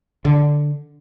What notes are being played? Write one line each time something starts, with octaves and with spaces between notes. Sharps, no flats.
D3